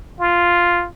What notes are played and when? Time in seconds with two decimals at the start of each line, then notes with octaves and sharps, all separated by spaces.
0.20 F4